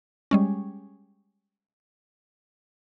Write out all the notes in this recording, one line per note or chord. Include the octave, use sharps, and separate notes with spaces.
G3 G#3 C#4